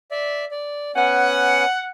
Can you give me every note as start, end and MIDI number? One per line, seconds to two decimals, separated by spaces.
0.11 0.45 74
0.11 0.45 76
0.51 0.92 74
0.96 1.65 59
0.96 1.65 61
0.96 1.89 78
0.96 1.65 80